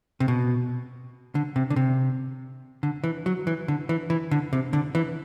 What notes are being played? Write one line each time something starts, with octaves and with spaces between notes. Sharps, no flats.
C3
B2
D3
C3
D3
C3
D3
E3
F#3
E3
D3
E3
E3
D3
C3
D3
E3